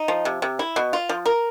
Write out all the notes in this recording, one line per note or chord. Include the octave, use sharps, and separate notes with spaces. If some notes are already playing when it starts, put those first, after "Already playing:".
Already playing: D#4
F3
C3
C3
E4
B2
F4
F3
A#4